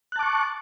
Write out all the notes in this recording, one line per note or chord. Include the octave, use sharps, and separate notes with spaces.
A5 C#6 D6 F#6